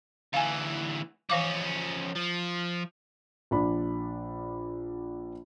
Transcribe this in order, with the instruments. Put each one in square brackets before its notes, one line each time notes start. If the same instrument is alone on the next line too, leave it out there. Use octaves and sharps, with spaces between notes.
[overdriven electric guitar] D2 E3 [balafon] F5 G#5
[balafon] E3 F5 D6 [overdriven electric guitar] F3 C#4
[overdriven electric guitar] F3
[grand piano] A#1 D4 B5